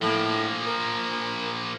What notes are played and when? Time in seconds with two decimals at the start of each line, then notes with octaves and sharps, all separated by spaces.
0.02 A2 F3 A#3
0.67 A#4